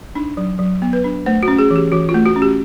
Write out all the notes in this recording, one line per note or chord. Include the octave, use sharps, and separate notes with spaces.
D4 D#4
F#3
F#3
B3
B4
D4
A3 C5
F#4
C#4
G#4
E3
G4
E3 F#4
F4
A3
F#4
C#4
G4